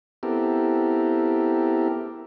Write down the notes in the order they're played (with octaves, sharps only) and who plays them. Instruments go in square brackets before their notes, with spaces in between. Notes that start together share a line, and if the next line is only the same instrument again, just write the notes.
[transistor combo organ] B3 C4 E4 G4 A4 A#4